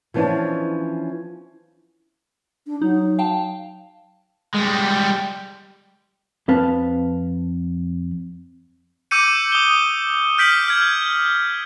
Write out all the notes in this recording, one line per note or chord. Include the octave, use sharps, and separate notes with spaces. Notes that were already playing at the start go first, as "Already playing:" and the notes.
E3 F3 B3 C#4 D4 E4
D4
F#3 D#4
F5 G5 A5
G3 G#3
F2 C4 B4 F5 A5
D6 E6 G6 C#7 D#7
D#6 G7
F6 G6 B6 D7 F#7
F6 G#6